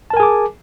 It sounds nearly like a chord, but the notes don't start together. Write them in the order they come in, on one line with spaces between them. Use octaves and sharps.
A5 A#4 G#5 G#4 D6